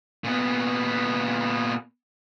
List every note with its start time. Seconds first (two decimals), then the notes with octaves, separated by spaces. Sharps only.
0.24 A#2 B3